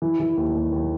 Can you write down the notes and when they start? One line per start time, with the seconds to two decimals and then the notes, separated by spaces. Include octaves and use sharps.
0.02 E3
0.20 E3
0.37 D#2
0.55 D#2
0.72 D#2